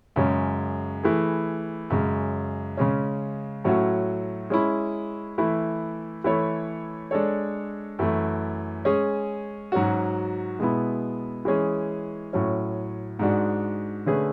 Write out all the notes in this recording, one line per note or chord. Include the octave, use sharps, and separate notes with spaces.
F#2 C#3 G#3 C#4 G#4
E3 A3 E4 G#4
F#2 C#3 G#3
C#3 G#3 C#4
A2 F#3 A3 C#4 F#4
G#3 C#4 E4
E3 A3 E4
E3 A3 E4 A4 C#5
G#3 D4 A4 C#5
F#2 E3 A3
G#3 C#4 G#4
G#2 F#3 C#4 F#4
B2 G#3 B3 E4
E3 G#3 C#4 G#4
A2 F#3 C#4
G#2 G#3 D4 F#4
D3 A3 C#4 G#4 B4